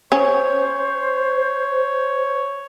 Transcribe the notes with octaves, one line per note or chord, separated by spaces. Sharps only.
C#4 C5 C#5